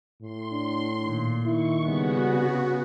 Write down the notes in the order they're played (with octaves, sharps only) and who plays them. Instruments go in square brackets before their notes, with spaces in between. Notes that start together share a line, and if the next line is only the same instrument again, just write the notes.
[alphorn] A2 [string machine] C6
[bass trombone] D4
[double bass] A#2 [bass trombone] D#3
[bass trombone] D#3 [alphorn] E4 [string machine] C#6
[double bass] C#3 B3 [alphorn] G3 [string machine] F#4
[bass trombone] C3